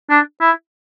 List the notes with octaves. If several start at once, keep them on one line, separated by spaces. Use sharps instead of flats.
D4
E4